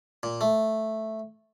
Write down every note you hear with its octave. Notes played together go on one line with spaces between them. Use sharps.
A#2
A3